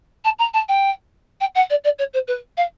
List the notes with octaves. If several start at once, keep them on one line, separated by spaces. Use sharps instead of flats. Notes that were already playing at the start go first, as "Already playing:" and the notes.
A5
A#5
A5
G5
G5
F#5
D5
D5
C#5
C5
B4
F5